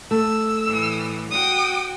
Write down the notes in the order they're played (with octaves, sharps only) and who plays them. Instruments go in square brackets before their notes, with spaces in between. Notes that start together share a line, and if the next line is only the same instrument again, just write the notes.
[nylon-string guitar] A3 [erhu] E6
[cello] A2 E3
[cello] F#4 G5 [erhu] D#6